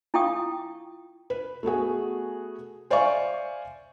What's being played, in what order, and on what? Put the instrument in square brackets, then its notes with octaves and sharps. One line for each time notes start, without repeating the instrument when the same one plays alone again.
[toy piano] E4 F4 F5 G5 C#6 D#6
[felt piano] B4
A3 B3 F#4 G#4
C5 D5 E5 F5 G#5 C#6